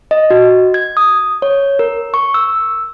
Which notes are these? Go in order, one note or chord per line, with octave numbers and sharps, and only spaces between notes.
D#5
F#4
G#6
D#6
C#5
A#4
C#6
E6